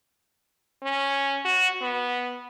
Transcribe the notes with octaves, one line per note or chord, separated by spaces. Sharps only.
C#4
F#4
B3